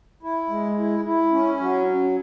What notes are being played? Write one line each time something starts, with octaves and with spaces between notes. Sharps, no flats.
E4
G#3
E4
E4
C#4
F#3